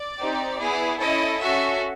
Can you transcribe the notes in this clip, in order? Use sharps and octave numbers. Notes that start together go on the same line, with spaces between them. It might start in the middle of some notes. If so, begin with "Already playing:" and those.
Already playing: D5
C4 D#4 G4
B3 E4 G#4
C#4 E4 A4 D#5
C#4 F#4 A4 E5